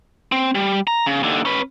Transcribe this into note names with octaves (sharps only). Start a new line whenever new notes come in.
C4
G3
A#5
C#3
D#2 D3
C#4 B4